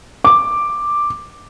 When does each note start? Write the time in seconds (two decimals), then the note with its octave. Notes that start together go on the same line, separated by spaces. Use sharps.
0.24 D6